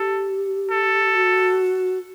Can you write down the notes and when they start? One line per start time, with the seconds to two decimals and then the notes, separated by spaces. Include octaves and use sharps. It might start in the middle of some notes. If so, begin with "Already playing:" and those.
Already playing: G4 A4
0.71 A4
1.15 F#4